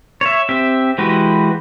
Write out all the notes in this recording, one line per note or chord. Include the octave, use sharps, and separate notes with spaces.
C#5 E5
C4 G4 E5
E3 G#3 F#4 G4 B4